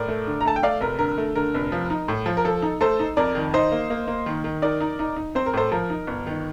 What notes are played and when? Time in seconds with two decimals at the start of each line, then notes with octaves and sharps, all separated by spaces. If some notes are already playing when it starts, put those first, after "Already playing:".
Already playing: A2 A#4 D5
0.08 A3
0.27 D3
0.41 A#5
0.45 A3 A5
0.56 G5
0.63 A3 D5 F5
0.80 F1 A#4
0.99 D3 A#4
1.18 A3
1.35 D3 A#4
1.54 F1
1.72 F3
1.90 D#4
2.08 A2
2.26 F3
2.37 A#4
2.45 F3 A4
2.62 D#4
2.81 A3 A4 C5
2.99 D#4
3.17 F2 A#4 D5
3.35 D#3
3.54 D#4 C5 D#5
3.72 A#3
3.90 A#3
4.07 A#3
4.26 D#3
4.44 D#3
4.62 D#4 A#4 D5
4.80 D#4
4.99 D#4
5.16 D#4
5.35 C4 C5
5.46 A#4
5.53 A2 A4 C5
5.72 F3 A#4
5.90 D#4
6.07 G1
6.27 D#3